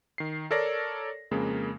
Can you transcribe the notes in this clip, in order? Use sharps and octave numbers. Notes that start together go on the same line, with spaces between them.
D#3 C7
A4 A#4 C#5 D5 A#6
F2 C#3 G#3 A#3